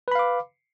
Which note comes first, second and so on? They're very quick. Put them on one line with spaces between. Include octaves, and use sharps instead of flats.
B4 B5 F5 D6